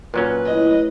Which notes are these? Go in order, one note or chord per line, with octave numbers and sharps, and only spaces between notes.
A#2 F#3 C#4 B4
A2 D#5 B5